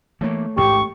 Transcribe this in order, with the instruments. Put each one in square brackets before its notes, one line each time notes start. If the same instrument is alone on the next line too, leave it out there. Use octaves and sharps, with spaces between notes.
[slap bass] E3 A#3 [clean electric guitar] A3 C#5
[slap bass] A1 D2 G#2 [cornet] G4 [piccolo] C#6